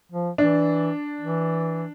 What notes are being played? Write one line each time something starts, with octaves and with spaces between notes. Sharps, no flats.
F3
E3 D4
E3